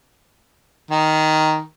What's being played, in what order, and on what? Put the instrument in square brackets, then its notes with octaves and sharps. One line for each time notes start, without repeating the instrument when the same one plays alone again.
[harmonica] D#3